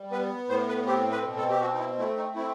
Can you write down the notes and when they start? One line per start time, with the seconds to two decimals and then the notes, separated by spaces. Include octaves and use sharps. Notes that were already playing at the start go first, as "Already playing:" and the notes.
Already playing: G3
0.11 B3 B4
0.48 A2 C5
0.68 B4
0.86 C4 G4
1.11 B4
1.24 B2
1.37 A4
1.50 G4
1.61 C4 F#4
1.74 D#4
1.79 E4
1.98 A3 E4
2.16 D#4
2.35 C4 E4